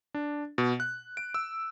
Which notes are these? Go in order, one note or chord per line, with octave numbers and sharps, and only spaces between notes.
D4
B2
F#6
D7
E6